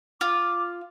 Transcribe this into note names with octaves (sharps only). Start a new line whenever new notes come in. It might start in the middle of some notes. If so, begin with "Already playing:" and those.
F4 D6